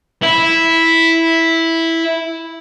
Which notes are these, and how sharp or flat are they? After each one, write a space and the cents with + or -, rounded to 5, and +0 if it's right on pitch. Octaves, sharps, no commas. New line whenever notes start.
E4 -5